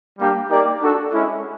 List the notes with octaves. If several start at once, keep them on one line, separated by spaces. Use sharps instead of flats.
G3 A#3 D4 G4
A#3 D#4 G4 A#4 D5
D4 F#4 A4
G#3 C#4 E4